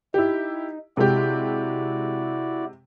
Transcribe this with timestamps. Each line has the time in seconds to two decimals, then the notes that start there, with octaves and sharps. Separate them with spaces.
0.14 D#4 E4 G4
0.97 C3 G#3 E4 F#4 G4 D5